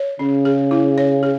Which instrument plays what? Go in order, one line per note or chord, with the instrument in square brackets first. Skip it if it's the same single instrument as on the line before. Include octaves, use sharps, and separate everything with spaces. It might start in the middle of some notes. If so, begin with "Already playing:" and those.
Already playing: [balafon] C#5
[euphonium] C#3 [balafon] C#4
[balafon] G#4
E4
C#5
G#4